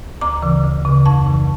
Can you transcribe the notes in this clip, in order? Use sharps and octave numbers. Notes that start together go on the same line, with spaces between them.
D2 A#5 D6
C#3 E3
D2
C#3 E3
F2 A5 C#6
C#3 E3